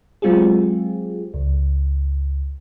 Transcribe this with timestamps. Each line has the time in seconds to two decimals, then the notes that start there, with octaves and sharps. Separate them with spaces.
0.22 F#3 G#3 C4 F4 G4 G#4
1.34 C#2